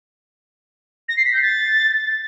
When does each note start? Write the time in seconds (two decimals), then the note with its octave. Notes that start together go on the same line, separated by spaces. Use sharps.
1.09 A#6
1.17 C7
1.25 B6
1.34 G6
1.42 A6